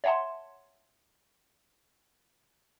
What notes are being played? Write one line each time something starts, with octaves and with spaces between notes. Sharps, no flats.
C#5 E5 F#5 A5 C6